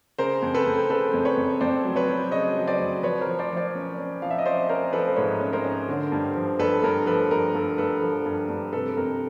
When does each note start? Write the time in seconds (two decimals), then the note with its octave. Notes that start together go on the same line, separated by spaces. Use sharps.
0.19 C#3 A#4 C5
0.42 F2
0.54 A4 B4
0.66 F2
0.89 C#3 A4 B4
1.13 F2
1.25 B4 C#5
1.37 F2
1.61 F2 C5 D5
1.85 F#3
1.96 B4 C#5
2.08 F#3
2.32 C#3 C#5 D#5
2.56 F#3
2.67 C5 D5
2.80 F2
3.03 F3 B4 C#5
3.21 A#4 C5
3.27 F3
3.39 C5 D5
3.51 F3
3.56 C5 D5
3.75 C#4
3.98 C#4
4.22 F3 F5
4.31 E5
4.38 D#5
4.45 C#4 C5 D5
4.69 C#4 A#4 C5
4.93 F3 A4 B4
5.08 C5
5.16 G#2 B4 C#5
5.41 C#4
5.53 A#4 C5
5.64 C#4
5.88 D3
6.12 G2
6.36 F3
6.59 G2 A4 B4
6.83 G2 A#4
7.06 F3 A4 B4
7.31 G2 A#4
7.55 G2 A4
7.78 G2 A4 B4
8.02 F3
8.26 G2
8.49 G2
8.73 C3 A4 B4
8.97 F2 A#4